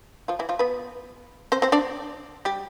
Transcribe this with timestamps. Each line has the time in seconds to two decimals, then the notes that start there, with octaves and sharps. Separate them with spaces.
0.28 F3 F4
0.39 E3 E4
0.49 F3 F4
0.59 B3 B4
1.52 C4 C5
1.62 C4 C5
1.72 D4 D5
2.45 G3 G4